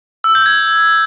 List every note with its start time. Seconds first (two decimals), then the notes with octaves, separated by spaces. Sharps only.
0.24 E6
0.35 G6
0.46 G#6